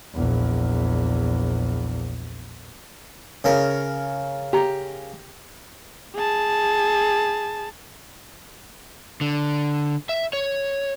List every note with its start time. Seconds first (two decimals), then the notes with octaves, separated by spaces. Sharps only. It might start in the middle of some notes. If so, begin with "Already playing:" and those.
0.14 A#1 E2
3.44 C#3 A#4
4.53 G4 A#5
6.15 G#4 A5
9.21 D3
10.09 E5
10.33 C#5